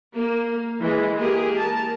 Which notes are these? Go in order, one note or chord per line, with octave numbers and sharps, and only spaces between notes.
A#3
E3 G#3
A#3 G4 G#4
A#4 A5